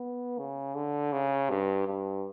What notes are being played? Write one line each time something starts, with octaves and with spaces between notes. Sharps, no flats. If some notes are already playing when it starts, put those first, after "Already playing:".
Already playing: B3
C#3
D3
C#3
G2
G2